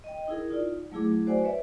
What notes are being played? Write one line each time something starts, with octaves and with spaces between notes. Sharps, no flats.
D#5 G5
D#4 E4 G#4 A#4
D#4 F4 D5
F#3 A3 E4 G#4 D6
F#4 C5 D5 F#5 G#5
B4 C#5 D5 E5